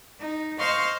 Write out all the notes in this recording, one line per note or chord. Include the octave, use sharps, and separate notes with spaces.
D#4
C5 D#5 F5 C6 C#6